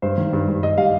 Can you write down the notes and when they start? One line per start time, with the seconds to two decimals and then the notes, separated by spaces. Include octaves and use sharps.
0.02 G2 C5
0.18 D#3
0.33 G2
0.48 G2
0.63 G2 D#5
0.78 G3 F5